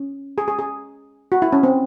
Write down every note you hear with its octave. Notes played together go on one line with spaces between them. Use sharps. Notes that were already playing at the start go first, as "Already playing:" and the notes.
Already playing: C#4
G#4
G#4
G#4
F#4
E4
C#4
C4